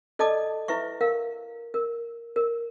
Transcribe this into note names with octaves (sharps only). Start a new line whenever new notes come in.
A4 D5 D#5 A5 D6
E4 B4 E5 C#6
A#4 F5
A#4
A#4